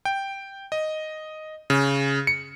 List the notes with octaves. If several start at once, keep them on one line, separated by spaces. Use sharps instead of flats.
G5
D#5
C#3
C#7